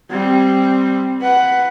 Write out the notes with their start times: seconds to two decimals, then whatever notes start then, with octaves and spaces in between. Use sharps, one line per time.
0.11 G3 C4
1.21 B4 F#5